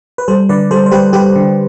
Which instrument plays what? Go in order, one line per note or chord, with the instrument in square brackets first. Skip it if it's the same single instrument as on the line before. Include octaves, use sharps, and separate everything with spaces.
[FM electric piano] B4
G3 A4 C5
D3 B4 D5
G3 A4 C5
C5
G3 G4 B4
G3 G4 B4
D3